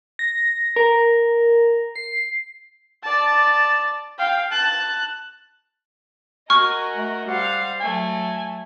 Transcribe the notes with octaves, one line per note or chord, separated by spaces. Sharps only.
A#6
A#4
C7
D5 A5
F5 G5
A5 F#6
F#4 A#4 D#5 G#5 C#6 F6
A3
G3 C5 F5 F#5
F#3 A3 G#5